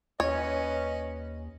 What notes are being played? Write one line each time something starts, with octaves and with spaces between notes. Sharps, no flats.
D#2 C#4 B4 C#5 D#5